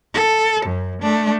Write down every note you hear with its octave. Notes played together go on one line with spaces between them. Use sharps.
A4
F#2
A3 D4